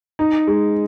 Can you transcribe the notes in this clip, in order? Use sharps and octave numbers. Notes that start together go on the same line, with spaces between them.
D#4
G#3